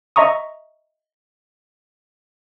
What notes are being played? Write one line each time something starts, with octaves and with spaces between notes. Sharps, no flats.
D#5 E5 A#5 C#6 D#6